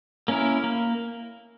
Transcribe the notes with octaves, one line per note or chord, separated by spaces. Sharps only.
A#3 C#4 E4 A#4
A#3